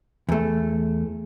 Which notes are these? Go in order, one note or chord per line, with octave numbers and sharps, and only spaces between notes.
E2 A3